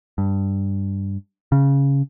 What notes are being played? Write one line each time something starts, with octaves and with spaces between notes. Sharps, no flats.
G2
C#3